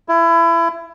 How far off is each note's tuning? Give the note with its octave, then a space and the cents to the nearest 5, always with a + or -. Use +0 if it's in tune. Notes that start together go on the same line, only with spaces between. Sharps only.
E4 +25